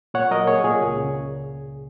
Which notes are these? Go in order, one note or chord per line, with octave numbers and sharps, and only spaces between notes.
A#2 C#5 F#5
F#3 A#4 D#5
A#3 G#4 C#5
A#2 G#4
C#2
C#3